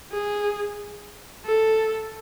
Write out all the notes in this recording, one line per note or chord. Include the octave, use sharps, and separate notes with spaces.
G#4
A4